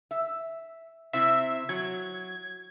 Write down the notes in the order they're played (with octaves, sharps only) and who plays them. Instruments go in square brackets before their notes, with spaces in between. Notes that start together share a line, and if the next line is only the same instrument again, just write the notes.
[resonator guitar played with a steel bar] E5
[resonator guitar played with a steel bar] C3 C4 E4 [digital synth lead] E5
[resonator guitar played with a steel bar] F#3 [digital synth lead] G#6